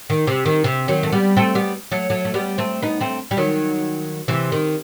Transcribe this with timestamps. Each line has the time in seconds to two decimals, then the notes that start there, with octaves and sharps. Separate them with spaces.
0.10 D#3
0.27 C3
0.46 D#3
0.64 C3
0.88 D#3 F#3
1.03 A3
1.12 G3 B3
1.37 A3 C4
1.55 G3 B3
1.91 F#3 A3
2.10 F#3 A3
2.25 A3
2.34 G3 B3
2.58 A3 C4
2.82 B3 D#4
3.00 A3 C4
3.31 G3
3.37 D#3 F#3
4.28 C3 E3
4.52 D#3